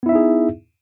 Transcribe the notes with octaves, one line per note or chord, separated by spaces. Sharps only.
B3 D#4 E4 G#4 E5